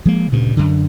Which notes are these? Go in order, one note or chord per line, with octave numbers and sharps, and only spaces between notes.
F3 G#3 A#3
D2 G2 A#2 C#3
F#2 D3